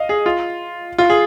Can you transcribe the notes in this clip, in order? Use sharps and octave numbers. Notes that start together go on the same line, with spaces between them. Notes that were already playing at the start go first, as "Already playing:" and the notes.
Already playing: D#5 F5
G#4
F4
F4
G#4